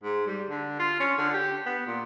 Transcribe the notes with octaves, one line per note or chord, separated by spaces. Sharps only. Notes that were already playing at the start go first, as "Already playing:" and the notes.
G#2
G3
D3
F4
C#4
D3
G4
B3
A#2